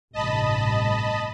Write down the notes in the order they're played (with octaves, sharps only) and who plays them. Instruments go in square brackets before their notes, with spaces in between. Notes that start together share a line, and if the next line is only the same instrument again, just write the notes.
[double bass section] A1 G2 C3 [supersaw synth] D#5 A5 B5